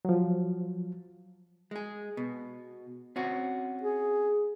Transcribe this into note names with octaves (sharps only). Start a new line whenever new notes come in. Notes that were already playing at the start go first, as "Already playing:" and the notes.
F3 F#3
G#3 G#4
B2
C4 C#4 F#4
G#4